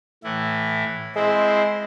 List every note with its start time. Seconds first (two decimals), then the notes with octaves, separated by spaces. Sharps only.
0.24 A2 E3 E4
1.15 G#3 C4 E4 C5